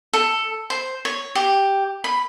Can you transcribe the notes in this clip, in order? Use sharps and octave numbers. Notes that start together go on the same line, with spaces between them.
A4
C5
C#5
G4
B5